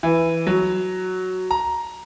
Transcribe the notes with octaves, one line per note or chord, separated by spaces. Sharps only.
E3
F#3
A#5